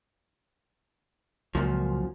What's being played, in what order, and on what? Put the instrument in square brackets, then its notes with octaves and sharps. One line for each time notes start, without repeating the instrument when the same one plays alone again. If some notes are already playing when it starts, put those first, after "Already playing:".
[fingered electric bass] C#2 [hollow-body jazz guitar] F#2 A#2 F3